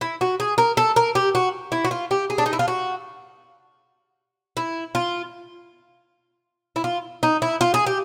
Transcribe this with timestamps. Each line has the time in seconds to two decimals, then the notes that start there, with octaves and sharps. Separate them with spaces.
0.01 E4
0.21 F#4
0.40 G#4
0.58 A#4
0.77 A4
0.96 A#4
1.15 G4
1.35 F#4
1.72 E4
1.85 F#4
1.91 F4
2.11 G4
2.30 G#4
2.38 D4
2.46 D#4
2.53 E4
2.59 F4
2.68 F#4
4.57 E4
4.95 F4
6.76 E4
6.84 F4
7.23 D#4
7.42 E4
7.61 F4
7.74 G#4
7.86 G4